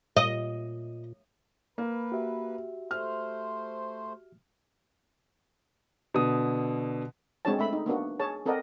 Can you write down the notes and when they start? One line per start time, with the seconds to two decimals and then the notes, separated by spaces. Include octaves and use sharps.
0.17 A#2 D#5
1.78 A#3 B4
2.12 F#4 G4 E5
2.91 A3 C5 F6
6.14 B2 D3 D#6
7.45 G#3 C4 D4 F#4 C#5 A5
7.59 A3 E5 B5
7.73 D#4
7.86 A#3 B3 D4 F#4
8.20 G#4 C#5 A5
8.46 C4 A4 A#4 D5 D#5 F#5